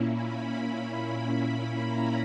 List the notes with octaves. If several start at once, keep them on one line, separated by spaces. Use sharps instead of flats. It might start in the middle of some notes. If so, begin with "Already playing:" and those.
Already playing: A#2 A#3 C#4 E4
B5
A#5